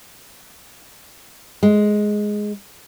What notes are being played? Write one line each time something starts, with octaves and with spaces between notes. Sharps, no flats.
G#3